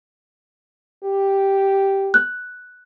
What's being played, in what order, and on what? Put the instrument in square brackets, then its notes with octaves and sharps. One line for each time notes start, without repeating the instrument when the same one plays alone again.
[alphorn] G4
[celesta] F#6